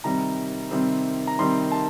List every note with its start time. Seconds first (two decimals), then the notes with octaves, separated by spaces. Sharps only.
0.04 C3 D#3 G3 C4 A#5
0.71 C3 D#3 G3 C4
1.27 A#5
1.39 C3 D#3 G3 C4 C6
1.72 A5